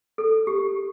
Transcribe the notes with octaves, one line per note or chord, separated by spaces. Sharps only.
A4
G4